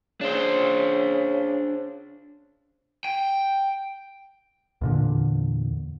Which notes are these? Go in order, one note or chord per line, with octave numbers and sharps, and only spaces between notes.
C#3 D4 C5
G5
E2 A#2 D3